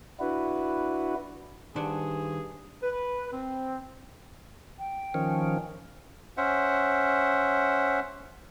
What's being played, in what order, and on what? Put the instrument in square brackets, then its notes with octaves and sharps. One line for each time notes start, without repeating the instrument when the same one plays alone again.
[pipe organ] D4 E4 F#4 B4
[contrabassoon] G2 [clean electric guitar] D#3 C5 [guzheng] D4 F#5 G#5 [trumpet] G#4
[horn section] B4
C4
[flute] G5
[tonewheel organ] D#3 F3 C#4
[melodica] C#4 C5 E5 F#5